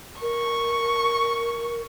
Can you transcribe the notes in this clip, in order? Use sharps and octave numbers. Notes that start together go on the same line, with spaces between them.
A#4 C#6